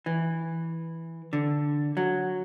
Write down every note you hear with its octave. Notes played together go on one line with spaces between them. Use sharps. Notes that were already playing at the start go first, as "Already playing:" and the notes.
E3
D3
F#3